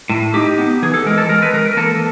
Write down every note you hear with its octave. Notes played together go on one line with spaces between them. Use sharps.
A2
D#4 G4
B3
E3 G#4
A4
G#3 A#4
A4
G#3 A#4
B4
E3 A#4
A#4
A#3 A4